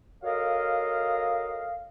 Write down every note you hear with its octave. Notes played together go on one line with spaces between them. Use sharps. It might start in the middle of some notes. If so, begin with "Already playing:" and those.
F#4 A4 A#4 C#5 D#5 F5